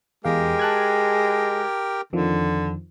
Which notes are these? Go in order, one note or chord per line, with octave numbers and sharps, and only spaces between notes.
E2 G#3 G4 A#4 F5 G5
A5 F#6 G#6
F2 D3 D#3 F3